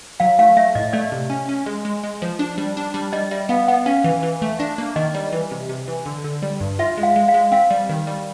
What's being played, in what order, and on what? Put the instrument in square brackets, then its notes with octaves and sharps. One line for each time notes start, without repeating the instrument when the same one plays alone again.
[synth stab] F#3 [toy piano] F5
[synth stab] A3 [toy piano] F5
[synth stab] A3 [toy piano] E5
[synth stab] A2 [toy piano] D#5
[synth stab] A3 [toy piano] D5
[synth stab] C3
C#4
C#4
G#3
G#3
G#3
F3
D4
G3
D4
G3
[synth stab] G3 [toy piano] D#5
[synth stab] G3 [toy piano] E5
[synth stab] B3 [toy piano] F5
[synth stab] B3 [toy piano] F#5
[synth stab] C#4 [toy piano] F5
[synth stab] E3
E3
A3
[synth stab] D4 [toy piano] E5
[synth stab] A#3
[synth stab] D#3 [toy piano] D#5
[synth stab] G3
E3
C3
C3
E3
D3
D3
G3
G2
[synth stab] F4 [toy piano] E5
[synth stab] G#3
[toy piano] F5
[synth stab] G#3
[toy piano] F5
[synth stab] G#3
[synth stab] C4 [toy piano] F5
[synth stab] G3
D#3
G3